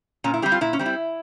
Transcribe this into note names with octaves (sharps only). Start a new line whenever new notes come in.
A#2 C#4
E4
G3 C4 G4
F4
A#2 E4
C#4
G3 C4
E4